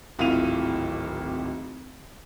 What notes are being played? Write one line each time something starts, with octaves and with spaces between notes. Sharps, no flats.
D1 G#1 E4 F4 D#7 F7